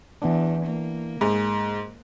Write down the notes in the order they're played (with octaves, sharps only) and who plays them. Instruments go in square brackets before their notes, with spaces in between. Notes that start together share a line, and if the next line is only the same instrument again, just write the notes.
[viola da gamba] E2 [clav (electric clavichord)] E3 B3 D4
[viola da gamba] A#3
[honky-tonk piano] G#2 [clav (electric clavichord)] G#4